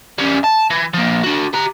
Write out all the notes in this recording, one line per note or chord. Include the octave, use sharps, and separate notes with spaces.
G3 C#4
A5
E3
F3 A#3
D4 F#4
G4 A#5